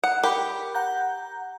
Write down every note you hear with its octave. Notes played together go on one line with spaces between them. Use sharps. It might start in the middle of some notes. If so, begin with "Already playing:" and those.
F#5
G4 A#4 B5
F#5 A#5 G6